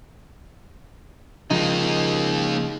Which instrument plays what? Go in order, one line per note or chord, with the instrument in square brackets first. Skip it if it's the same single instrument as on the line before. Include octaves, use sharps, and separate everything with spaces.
[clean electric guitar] C#3 F3 G#3 [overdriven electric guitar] A#3 D#4